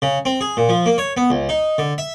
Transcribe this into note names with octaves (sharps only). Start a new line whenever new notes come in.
C#3
C4
G#4
A#2
F3
A#3
C#5
B3
C#2
D#4
D3
E5